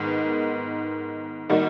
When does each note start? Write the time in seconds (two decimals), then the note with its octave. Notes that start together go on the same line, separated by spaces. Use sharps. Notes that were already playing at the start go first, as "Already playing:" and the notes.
Already playing: G#2 D#3 G#3 B3
1.49 D#3 G3 A#3 D#4 F#4